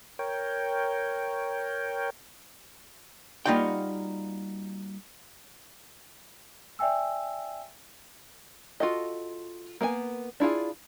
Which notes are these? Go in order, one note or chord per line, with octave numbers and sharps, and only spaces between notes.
A#4 C#5 G5
G3 A#3 D#4 F4 F#4 G5
D5 E5 G5 G#5 E6
F4 F#4 A4 D#5
A#3 B3 C5 G#5
D4 E4 F4 G#4